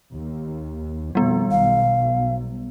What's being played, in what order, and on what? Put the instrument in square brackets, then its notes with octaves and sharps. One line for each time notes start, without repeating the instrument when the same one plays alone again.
[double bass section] D#2
[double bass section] F2 B2 D#3 [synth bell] G3 B3
[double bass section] B1 B2 [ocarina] F5